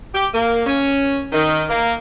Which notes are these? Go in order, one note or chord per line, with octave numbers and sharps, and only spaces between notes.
G4
A#3
C#4
D#3
A#3